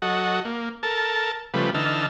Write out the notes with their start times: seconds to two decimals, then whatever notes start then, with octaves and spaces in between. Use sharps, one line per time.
0.02 F#3 F#4 A4 D#5 F#5
0.45 A#3
0.83 A4 A#4 A5
1.54 C#3 F3 G3 A3 B4
1.74 D3 E3 D#4 A5 E6 F6